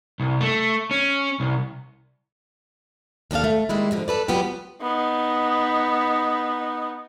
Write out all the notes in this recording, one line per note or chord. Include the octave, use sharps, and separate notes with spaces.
C2
A3
C#4
C2
D#2 D#3 D4 A4 F5
A3
D#3 G3 G#3 A#3 E4
D2 D3 F3
A4 B4 D5
F#3 G3 B3 C#4 F4 G4
B3 D#4